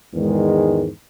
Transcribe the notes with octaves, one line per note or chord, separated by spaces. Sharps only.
E2 G#2 D#3 G#3